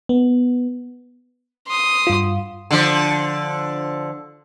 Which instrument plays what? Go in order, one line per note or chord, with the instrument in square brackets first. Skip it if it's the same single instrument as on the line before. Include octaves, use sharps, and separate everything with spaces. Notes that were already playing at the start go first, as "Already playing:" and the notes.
[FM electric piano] B3
[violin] C6 D#6
[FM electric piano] G2 F4
[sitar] D3 F3